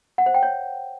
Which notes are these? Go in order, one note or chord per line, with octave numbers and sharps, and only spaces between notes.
F#5
C5
G5
C#5